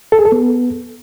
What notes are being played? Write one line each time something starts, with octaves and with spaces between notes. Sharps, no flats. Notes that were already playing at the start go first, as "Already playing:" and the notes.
A4
G#4
A4
B3